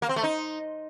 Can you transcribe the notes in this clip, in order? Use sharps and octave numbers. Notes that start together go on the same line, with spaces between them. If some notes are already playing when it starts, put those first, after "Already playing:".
A#3
C4
A3
D#4